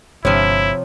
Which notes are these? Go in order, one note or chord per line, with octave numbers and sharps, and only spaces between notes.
G1 C3 F3 G#3 D4 E4 C#5